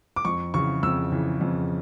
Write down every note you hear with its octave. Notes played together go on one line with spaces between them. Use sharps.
D6
F2 C#6
C#3 E3 C#6
F2 E6
C#3 E3
F2